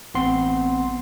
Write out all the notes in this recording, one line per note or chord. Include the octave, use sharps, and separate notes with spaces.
A1 B3 C4 F#5 C6